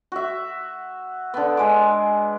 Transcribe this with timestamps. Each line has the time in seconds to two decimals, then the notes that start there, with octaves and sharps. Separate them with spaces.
0.12 F#4 E5
1.34 D3 B3
1.57 G#3 D6